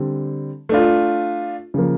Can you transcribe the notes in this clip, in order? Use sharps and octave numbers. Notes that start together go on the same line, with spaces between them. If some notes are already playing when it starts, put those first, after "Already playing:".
Already playing: D3 G3 C4
A3 D4 F4
C#3 F3 A#3